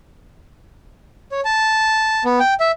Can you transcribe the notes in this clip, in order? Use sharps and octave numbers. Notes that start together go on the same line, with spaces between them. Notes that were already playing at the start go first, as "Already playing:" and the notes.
C#5
A5
B3
G5
E5